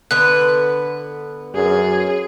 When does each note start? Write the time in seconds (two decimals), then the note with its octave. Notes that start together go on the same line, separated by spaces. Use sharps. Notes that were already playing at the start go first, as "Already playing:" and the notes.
0.11 D3 B3 B4 F#6
1.55 F#2 G#4